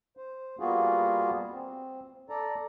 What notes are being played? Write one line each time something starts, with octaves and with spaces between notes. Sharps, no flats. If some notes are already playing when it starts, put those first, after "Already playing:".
C5
G3 A#3 B3 F4 F#4 G#4
C4
A4 D5 A#5